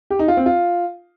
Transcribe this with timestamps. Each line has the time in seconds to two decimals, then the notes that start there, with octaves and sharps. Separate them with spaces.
0.10 G4
0.19 D#4
0.28 F4
0.37 C4
0.46 F4